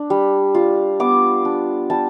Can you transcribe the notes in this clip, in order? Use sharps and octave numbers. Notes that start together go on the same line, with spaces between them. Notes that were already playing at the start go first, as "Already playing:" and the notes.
Already playing: D4
G3
F4
B3 D6
D4
G3 A5